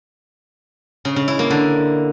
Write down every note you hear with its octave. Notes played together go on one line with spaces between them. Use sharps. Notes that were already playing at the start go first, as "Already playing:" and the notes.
C#3
C#3
E4
A#3
D3